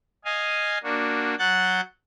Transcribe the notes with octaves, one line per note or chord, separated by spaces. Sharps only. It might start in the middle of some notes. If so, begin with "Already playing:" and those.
D#5 F5 G#5
A#3 D4 F#4
F#3 F#5 F#6 G6 A6